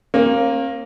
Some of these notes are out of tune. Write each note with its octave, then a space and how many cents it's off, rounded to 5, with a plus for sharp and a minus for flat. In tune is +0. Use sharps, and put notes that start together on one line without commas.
A#3 +0 C#4 -45